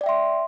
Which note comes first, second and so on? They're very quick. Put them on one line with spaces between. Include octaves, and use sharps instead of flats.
D5 G5 E5 C6